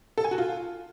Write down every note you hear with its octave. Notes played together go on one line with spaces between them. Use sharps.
A4
G#5
F#4
F4